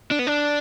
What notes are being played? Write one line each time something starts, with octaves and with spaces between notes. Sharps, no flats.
D4
B3
D4